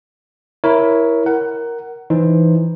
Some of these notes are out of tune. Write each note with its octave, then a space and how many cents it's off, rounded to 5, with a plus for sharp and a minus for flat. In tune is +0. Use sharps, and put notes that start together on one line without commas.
E4 +0 A#4 +15 C#5 +0
A#4 +5 F#5 +20
E3 +5 D#4 +0 C5 +15